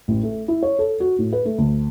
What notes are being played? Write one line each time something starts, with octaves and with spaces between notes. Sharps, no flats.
A1
A3
E4
C#5
A4
F#4
A2
B4
A3
D2